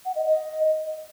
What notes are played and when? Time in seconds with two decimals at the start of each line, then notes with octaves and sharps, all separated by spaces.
0.05 F#5
0.15 D#5
0.26 D#5